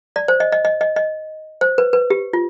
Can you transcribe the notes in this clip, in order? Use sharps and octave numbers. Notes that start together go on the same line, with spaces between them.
D5
C5
D#5
D#5
D#5
D#5
D#5
C5
B4
B4
G4
F4